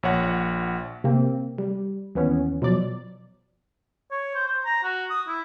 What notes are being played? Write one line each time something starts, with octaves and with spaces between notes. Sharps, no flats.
A#1 C#5 F#5
C3 A#3 C4
G3
D#2 E3 B3 C#4
B2 F3 F#3 D5
C#5
C5
C5
A#5
F#4
D#6
E4